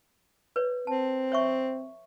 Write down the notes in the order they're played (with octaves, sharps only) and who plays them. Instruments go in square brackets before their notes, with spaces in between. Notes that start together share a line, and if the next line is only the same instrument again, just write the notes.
[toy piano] B4 C#5 D5
[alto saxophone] C4 [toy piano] A5
[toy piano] C#5 E5 C#6